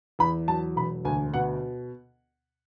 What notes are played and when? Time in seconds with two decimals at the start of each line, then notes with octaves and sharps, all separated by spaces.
0.19 E2 B5
0.47 F#3 A5
0.76 E1 B5
1.05 D2 G#5
1.34 B2 F#5